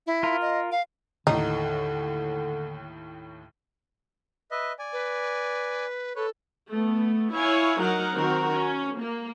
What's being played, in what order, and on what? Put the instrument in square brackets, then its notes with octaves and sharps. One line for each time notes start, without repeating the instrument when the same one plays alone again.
[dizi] E4
[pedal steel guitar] F4 A#4
[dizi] D#5
F5
[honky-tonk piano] D#2 A2 [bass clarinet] D3 [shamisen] D#4
[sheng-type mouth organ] B4 D#5 E5
D5 G#5
[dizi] B4
[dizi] A4 [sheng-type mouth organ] B4 C#5
[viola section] A3 B3
E4 C#5 F5 G#5
F#3 D#4 A#4 F#5
D#3 C4 F#4 A#4
C#4
A#3